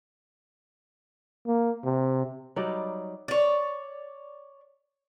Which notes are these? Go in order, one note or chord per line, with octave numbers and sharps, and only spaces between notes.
A#3
C3
F#3 G3 D#4 D5
C#5 D5